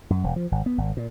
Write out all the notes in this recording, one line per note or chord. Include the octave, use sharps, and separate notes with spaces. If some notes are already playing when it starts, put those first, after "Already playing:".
F#2
E1
F3
G#1
B3
G#1
A#2